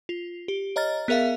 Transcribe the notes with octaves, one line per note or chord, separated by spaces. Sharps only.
F4
G4
C#5 D#5 A#5 F6 A6
B3 G#4 A#4 E5 F5